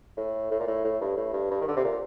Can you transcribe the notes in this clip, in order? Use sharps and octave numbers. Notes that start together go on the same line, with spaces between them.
A2
A2
A#2
A2
A2
G2
A2
G2
G2
D#3
D3
C3
A#2